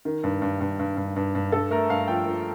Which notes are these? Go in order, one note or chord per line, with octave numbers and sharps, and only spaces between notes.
D#3
G2
G2
G2
G2
G2
G2
G2
G2 A4
A3 A#4
G2 F5
F3 G5
F3